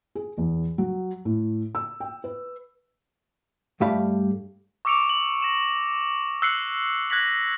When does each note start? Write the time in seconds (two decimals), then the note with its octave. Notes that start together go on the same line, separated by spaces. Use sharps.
0.15 G#4
0.38 E2
0.78 F#3
1.25 A2
1.75 E6
2.00 G5
2.24 B4
3.81 G2 G3 A3 G4 F5 B5
4.85 C#6 D6 E6 C#7 D7 F7
5.10 F#7
5.42 A#6 E7
6.42 E6 F#6 C7 C#7 F#7
7.10 F#6 G#6 A#6 B6 F#7